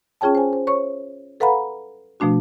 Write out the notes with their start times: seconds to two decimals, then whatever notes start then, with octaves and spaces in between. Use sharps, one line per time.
0.21 C#4 F4 G#4 C#5 G5 A5
0.35 C5 G#5
0.53 C5
0.67 C5 C#5 C#6
1.40 A4 B4 F5 F#5 A#5 B5
2.20 B2 F3 A3 D4 F#4